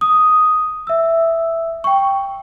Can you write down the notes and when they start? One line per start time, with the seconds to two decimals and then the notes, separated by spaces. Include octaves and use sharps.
0.01 D#6
0.87 E5 E6
1.84 G5 C#6